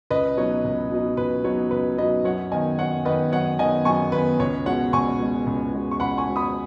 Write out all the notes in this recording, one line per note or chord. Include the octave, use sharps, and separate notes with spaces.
C#2 B4 D#5
B2 F#3 D#4 C#5
C#2
B2 F#3 D#4
C#2 B4
B2 F#3 D#4 C#5
C#2 B4
B2 F#3 D#4 B4 D#5
F#2 C#5 F#5
D#3 B3 D#5 G#5
F#2 C#5 F#5
D#3 B3 B4 D#5
F#2 C#5 F#5
D#3 B3 D#5 G#5
F#2 G#5 C#6
D#3 B3 B4
C#2 C#5
B2 G#3 C#5 F#5
C#2 G#5 C#6
B2 G#3
C#2
B2 G#3
C#6
C#2 F#5 B5
G#5 C#6
B2 G#3
B5 D#6